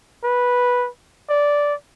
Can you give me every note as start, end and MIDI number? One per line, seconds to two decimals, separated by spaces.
0.24 0.88 71
1.30 1.74 74